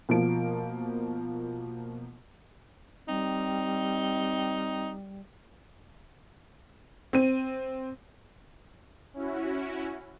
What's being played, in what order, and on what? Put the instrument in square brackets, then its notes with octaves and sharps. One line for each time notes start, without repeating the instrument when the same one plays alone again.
[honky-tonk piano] B2 F3 A#3 D7
[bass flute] G3 [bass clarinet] C4 [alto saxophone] D#4
[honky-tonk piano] C4 D#7
[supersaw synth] C#4 E4 F#4